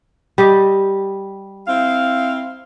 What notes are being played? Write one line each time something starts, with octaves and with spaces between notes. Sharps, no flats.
G3 G4 D#5
C4 E4 F5